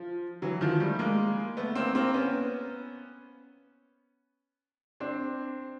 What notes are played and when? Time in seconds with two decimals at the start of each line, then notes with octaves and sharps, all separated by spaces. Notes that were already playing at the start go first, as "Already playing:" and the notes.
Already playing: F3
0.42 E3 F#3
0.61 D#3 F3
0.80 G3 A3
0.99 G#3 A#3
1.57 A3 B3
1.75 A#3 C4
1.95 A#3 C4
2.14 B3 C#4
5.00 C4 D4